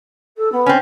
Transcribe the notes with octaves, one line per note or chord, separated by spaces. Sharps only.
A4
B3
C4 C#4